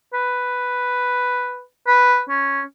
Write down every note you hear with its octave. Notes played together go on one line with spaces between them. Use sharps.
B4
B4
C#4